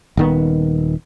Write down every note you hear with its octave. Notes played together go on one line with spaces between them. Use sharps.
D#1 D#3 B3